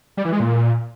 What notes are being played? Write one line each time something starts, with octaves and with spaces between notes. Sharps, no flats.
G3
E3
G#3
A#2